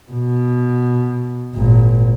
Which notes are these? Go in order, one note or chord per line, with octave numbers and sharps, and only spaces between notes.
B2
G#1 A#2